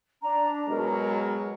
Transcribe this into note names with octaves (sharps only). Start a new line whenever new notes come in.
D4 A#5
B2 F#3 G#3 A#4